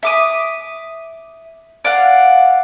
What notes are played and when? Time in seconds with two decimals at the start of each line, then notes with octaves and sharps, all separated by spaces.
0.03 E5 D6 D#6
1.85 D5 F5 F#5